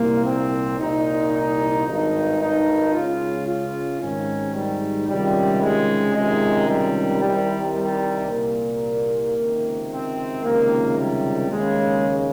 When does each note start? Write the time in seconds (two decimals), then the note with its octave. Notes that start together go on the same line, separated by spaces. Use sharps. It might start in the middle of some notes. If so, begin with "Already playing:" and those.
Already playing: C2 A#2 A#3
0.25 C4
0.79 C2 A#2 D#4
1.33 D#4
1.86 G#1 G2 D#3 D#4
2.40 D#4
2.93 C#2 C#3 F4
3.48 F4
4.01 G#1 G#2 D#3 C#4
4.55 G3
5.08 C#2 C3 D#3 G3
5.62 G#3
6.15 C#2 C3 D#3 G#3
6.69 G3
7.22 C2 C3 D#3 G3
7.76 G3
8.30 C2 A#2 A#3
9.36 C#2 C3 D#3
9.91 C4
10.44 C#2 C3 D#3 A#3
10.98 G3
11.51 D#2 C#3 G#3